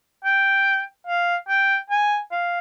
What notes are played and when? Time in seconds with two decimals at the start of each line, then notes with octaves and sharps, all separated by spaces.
0.24 G5
1.07 F5
1.49 G5
1.90 G#5
2.32 F5